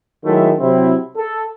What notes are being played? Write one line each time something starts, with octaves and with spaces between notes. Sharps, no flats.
D#3 F#3 G#3 A3 E4
C3 F#3 C4 E4
A4